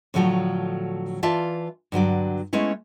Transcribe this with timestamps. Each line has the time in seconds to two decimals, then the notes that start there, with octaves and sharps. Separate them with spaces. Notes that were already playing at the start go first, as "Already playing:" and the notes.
0.14 A2 D3 F3 F#3 G#3 A3
1.23 E3 F4 D5 E5 F5 A5
1.92 G2 D3 F#3 D5
2.53 G#3 A3 B3 C#4 E4